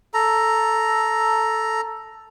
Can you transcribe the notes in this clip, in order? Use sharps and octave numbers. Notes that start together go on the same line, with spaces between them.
A4 A#5